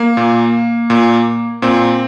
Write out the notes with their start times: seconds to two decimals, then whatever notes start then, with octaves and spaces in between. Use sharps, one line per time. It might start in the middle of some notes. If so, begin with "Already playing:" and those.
Already playing: A#3
0.17 A#2
0.90 A#2
1.62 A#2 C4